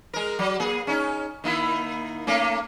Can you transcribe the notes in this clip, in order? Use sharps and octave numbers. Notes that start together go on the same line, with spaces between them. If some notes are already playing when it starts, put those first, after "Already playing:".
G#3 A#4
F#3
A#3 G#4
C#4 D#4
D#3 A#3 E4
A3 A#3 C#4